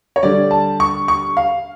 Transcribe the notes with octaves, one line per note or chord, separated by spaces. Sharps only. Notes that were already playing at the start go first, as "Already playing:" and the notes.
C#5
D3 G3 D5
A5
C#6
C#6
F5